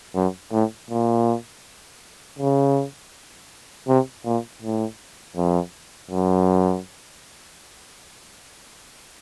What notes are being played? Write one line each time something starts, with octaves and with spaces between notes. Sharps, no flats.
F#2
A2
A#2
C#3
C3
A#2
A2
F2
F#2